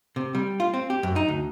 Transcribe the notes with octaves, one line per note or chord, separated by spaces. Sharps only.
C3
G3
F4
C4
G4
F#2
D#4
D2